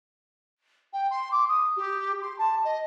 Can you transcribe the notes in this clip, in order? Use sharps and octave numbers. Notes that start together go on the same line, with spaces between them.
G5
C6
D6
D#6
G4
C6
A5
D#5